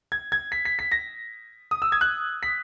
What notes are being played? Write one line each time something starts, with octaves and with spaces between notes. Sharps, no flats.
G#6
G#6
B6
B6
B6
A#6
D#6
E6
G#6
F#6
B6